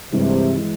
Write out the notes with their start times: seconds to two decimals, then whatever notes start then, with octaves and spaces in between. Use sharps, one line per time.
0.12 G2 C3 E3 G#3
0.55 E3 G#3